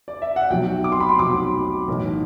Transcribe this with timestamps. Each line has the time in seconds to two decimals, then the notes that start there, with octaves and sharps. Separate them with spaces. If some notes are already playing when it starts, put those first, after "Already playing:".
0.08 D5
0.22 E5
0.36 F#5
0.50 B1 B2 F#3 G5
0.84 D6
0.92 C6
1.00 B5
1.09 C6
1.19 B1 B2 F#3 D6
1.88 B1 A2 E3